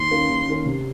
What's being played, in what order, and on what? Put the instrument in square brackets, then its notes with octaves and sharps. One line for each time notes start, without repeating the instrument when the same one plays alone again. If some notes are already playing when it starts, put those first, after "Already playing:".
Already playing: [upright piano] D#2 [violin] C6
[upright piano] D#3 A#3 C#4
D#2
D#3 A#3 C#4
C3